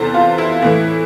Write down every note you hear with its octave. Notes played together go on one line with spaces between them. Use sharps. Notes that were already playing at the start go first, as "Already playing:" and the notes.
Already playing: E2 C3 E3 A4 C5
F4
E4
A2 E3